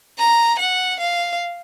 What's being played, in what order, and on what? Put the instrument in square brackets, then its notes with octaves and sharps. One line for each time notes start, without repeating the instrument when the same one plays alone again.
[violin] A#5
F#5
F5